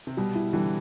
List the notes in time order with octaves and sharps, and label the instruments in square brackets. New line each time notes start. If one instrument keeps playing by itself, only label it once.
[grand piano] C3
[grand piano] B2 [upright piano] G3
[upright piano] E4
[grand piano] D3 E3 [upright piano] G3